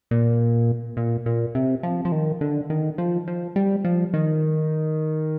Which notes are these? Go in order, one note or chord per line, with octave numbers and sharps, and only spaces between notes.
A#2
A#2
A#2
C3
F3
F3
D#3
D3
D#3
F3
F3
G3
F3
D#3